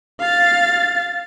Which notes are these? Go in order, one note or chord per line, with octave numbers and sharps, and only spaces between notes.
F5 A6